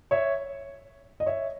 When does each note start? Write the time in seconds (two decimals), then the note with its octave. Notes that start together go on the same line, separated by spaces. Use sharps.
0.11 C#5 E5
1.20 D#5
1.26 C#5 E5